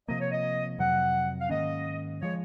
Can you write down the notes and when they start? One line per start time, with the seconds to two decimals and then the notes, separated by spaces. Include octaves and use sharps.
0.08 C3 F3 A#3 D#5
0.21 C#5
0.31 D#5
0.78 F2 C3 F#3 F#5
1.40 F5
1.49 G#2 D#3 A#3 C#4 D#5
2.21 F3 G#3 C#5